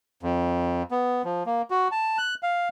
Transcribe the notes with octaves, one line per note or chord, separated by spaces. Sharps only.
F2
B3
F3
A#3
F#4
A5
F#6
F5